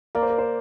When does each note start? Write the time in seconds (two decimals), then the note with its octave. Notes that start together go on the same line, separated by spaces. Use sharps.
0.15 A#3 D5
0.22 C5
0.30 A#4
0.38 C5